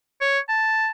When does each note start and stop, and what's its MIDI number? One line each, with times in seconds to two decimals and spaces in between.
0.21 0.39 73
0.49 0.89 81